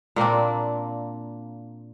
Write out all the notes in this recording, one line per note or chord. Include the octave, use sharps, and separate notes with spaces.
A#2 A#3 C4 D4